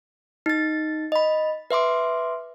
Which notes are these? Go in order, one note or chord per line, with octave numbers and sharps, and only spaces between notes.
D#4 A6
D#5 B5
B4 E5 C6 D6